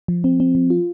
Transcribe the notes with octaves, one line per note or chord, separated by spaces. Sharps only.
F3
C4
C4
F3
F4